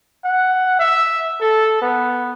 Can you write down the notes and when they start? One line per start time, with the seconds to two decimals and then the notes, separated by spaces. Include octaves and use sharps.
0.24 F#5
0.79 E5
1.41 A4
1.82 B3